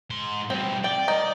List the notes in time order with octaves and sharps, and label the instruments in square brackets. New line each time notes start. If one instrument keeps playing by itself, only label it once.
[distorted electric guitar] G#2 C6
[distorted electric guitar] G2 B2 [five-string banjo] C4
[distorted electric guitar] D5 [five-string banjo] G5
[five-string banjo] D#3 D#4